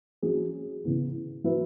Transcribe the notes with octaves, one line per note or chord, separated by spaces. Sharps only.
F#3 C#4 G#4
C#3 E3 B3 E4
F#3 E4 B4 E5